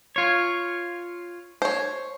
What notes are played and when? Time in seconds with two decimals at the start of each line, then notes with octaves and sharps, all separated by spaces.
0.16 F4 C#5
1.62 C5 C#5